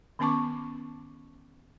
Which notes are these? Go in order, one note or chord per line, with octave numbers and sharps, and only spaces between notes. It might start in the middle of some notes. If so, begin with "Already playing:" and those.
D#3 B3 C#4 A5 C#6 D6